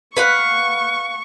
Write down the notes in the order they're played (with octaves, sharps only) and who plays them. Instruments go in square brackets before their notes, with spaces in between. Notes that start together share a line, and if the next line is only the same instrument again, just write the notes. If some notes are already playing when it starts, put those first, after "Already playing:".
[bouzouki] B4 F5 F#5 [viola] C#6